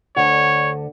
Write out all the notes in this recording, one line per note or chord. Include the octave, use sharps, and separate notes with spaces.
D2 D3 C#5 F#5